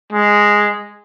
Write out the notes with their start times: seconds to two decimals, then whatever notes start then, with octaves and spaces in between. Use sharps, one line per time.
0.13 G#3